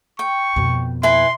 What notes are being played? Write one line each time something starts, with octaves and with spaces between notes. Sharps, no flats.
G5 C#6
F2 B2
E4 B4 G#5 C6